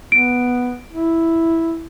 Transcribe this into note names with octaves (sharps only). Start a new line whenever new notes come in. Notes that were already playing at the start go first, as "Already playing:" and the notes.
B3 D7
E4